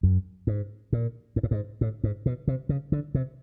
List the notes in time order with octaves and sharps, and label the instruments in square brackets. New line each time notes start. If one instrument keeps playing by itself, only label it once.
[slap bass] F#2
G#2
A#2
G#2
A2
G#2
A2
G#2
B2
C3
C#3
D3
C3